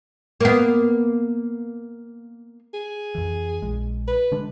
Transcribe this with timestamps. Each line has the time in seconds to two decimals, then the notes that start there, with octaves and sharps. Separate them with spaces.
0.41 A#3 B3
2.74 G#4
3.15 F2 E3
3.62 A#1 G#3
4.07 B4
4.32 D3 G#3 D4